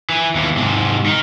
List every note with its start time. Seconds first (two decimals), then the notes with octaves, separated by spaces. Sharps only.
0.10 E3
0.35 D#2 E3
0.57 G#2 C3
1.06 D#3 D#4